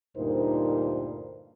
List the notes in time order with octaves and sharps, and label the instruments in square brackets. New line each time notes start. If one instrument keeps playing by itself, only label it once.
[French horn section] D2 G2 A#2 D#4 A#4 C5